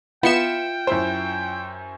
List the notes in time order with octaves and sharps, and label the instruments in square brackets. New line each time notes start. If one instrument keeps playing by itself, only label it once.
[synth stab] B3 C#7 E7 [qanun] F4 E5 [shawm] G5
[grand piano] F#2 E4 C5